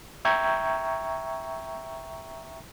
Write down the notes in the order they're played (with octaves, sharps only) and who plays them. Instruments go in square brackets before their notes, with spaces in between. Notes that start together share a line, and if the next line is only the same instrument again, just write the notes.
[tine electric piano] E5 G5 A#5 C#6 G6 G#6